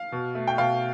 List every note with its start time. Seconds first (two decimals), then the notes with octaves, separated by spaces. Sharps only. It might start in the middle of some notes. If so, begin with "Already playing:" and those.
Already playing: F5
0.12 B2
0.35 A3
0.47 G5
0.58 B2 F5